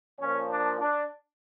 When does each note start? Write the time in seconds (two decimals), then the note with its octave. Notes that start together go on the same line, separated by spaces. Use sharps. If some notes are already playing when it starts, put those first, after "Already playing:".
0.19 A#2 F3 C#4
0.50 D4
0.80 D4